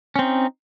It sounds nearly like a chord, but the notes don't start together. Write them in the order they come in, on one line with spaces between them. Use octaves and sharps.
C#4 C4 D#4